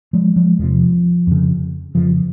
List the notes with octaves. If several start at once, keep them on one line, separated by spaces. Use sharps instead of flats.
F3 G#3
F3 G#3
E2 C3 F3
F2 C#3
F2 C#3 F3